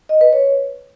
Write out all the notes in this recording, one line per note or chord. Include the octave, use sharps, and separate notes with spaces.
D#5
B4
C#5